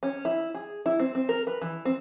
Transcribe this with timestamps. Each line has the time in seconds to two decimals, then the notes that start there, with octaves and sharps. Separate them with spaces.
0.03 C#4
0.25 E4
0.54 G#4
0.86 E4
1.00 C4
1.15 C4
1.29 A#4
1.47 B4
1.61 E3
1.85 C4